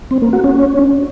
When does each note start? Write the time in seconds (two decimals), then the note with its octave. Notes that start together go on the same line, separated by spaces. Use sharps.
0.11 C4
0.22 A#3
0.33 F#4
0.44 C#4